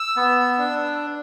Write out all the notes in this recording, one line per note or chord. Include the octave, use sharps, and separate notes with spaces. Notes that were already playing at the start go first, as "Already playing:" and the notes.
Already playing: E6
B3
D4